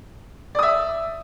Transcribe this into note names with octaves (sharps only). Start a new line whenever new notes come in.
D5 E5 D#6